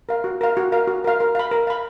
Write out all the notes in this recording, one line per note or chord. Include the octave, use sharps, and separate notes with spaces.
A#4 F5
F#4
A#4 F5
F#4
A#4 F5
F#4
A#4 F5
A#4
F5 B5
A#4
F5 B5